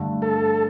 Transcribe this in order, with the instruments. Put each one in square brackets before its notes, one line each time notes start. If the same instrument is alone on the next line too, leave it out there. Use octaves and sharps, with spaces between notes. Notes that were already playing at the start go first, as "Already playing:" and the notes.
Already playing: [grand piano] G2 D3 A3
[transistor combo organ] A4